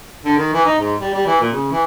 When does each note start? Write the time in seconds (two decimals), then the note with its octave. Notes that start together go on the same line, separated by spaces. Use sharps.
0.25 D3
0.37 D#3
0.53 E3
0.65 D#4
0.79 G#2
1.00 G3
1.14 G3
1.27 E3
1.41 A#2
1.52 C#3
1.72 E3